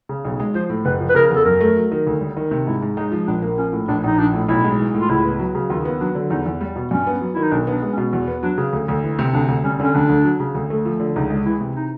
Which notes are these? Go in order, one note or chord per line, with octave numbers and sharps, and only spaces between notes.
C#3
B1
G#3
F3 C5
A2
F#1 B4
F3
B4
C#3 A#4
E2
A4
F#2 A#4
A3
F#3
D#3
D2
G3
D#3
C3
G#2 E4
G#2
G#3 D#4
F3
A#1 D4
A#3
F3 C#4
A2
A#1 D4
A#1 D#4
F3 D4
A2
B1 E4
G#3
E3
A2
F4
C#2 E4
B3
F#3
C#3
D#2 F4
B3
F#3 D4
D3
E2 D#4
E2
G3
B2
G2 C#4
B3
F#3
D#3 E4
D#4
B1 D4
B3 D4
G#3
C#4
B2
E2
B3
F#3 D4
C#3
D2
D2
E3
C3
D2 D4
D2
G3 C#4
D3 C#4
D2 D4
D2
F#3
C#3
D2
A3
F3
D3
C#2 D#4
G#3
E3 E4
C3
D#4